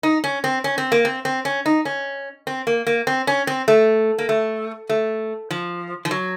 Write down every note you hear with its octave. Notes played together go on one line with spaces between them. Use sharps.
D#4
C#4
C4
C#4
C4
A#3
C4
C4
C#4
D#4
C#4
C4
A#3
A#3
C4
C#4
C4
A3
A#3
A3
A3
F3
F3
F#3